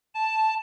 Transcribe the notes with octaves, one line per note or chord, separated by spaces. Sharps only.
A5